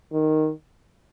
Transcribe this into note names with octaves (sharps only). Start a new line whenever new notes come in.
D#3